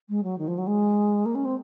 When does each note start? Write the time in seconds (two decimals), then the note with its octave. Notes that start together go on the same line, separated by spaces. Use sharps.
0.09 G#3
0.23 F#3
0.38 D#3
0.47 F3
0.57 F#3
0.67 G#3
1.25 A#3
1.35 C#4
1.45 C4